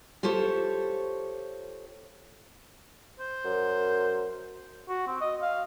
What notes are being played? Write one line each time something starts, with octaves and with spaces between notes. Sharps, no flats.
F4 G4 A4 C5 C#5
C5
F#2
F#4
C4
D#5
F5